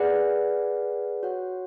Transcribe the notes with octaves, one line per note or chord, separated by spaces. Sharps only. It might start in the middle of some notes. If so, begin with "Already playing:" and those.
Already playing: G#4 B4 D5 F#5
F#4 C#5 F#5